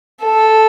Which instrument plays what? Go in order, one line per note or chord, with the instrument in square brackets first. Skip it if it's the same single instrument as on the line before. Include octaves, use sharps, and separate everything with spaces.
[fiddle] A4